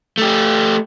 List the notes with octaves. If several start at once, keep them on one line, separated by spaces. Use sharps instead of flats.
A3 G4